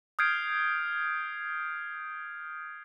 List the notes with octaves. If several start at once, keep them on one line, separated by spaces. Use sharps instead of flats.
D#6 F6 G6 G#6 C7 D7